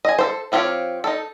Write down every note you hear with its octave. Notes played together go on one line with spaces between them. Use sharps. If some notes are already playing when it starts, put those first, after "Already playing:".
D#5 G#5
A4 C5
F3 C4 F4 G4 C#5
D#4 A4